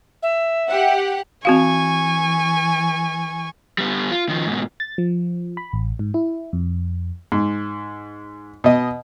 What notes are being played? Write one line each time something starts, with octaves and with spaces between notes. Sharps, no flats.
E5
G4 F#5
E3 C4 F#4 F5 G#5 C#6
G3 B3
F4
D#3 F3
G#2 B2
A6
F3
B5
A1
G#2
E4
F2
G#2
B2 D#5